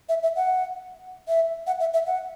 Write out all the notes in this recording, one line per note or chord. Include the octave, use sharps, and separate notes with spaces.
E5
E5
F#5
E5
F#5
E5
E5
F#5